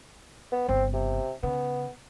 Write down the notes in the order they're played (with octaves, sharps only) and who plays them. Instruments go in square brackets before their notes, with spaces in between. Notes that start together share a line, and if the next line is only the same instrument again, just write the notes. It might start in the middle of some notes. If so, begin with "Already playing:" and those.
[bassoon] B3
[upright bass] G1 C#3 [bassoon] C4
[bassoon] C3
[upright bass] C#3 [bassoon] B3